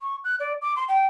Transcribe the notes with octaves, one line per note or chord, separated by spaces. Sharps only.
C#6
F#6
D5
D6
C6
G5